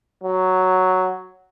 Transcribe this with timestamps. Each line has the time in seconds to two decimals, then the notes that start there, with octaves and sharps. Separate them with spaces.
0.23 F#3